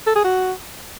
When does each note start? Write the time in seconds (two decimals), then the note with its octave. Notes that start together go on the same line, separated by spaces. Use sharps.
0.07 A4
0.15 G#4
0.24 F#4